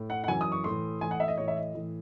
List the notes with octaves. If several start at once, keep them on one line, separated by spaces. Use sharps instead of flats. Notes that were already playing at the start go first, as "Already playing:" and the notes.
Already playing: A2
F#5
F#5
F#2 E3 G#5
D#6
C#6
A2 E3 C6
A2 E3 G#5
F#5
E5
D#5
A2 E3 C#5
E5
D#5
A2 E3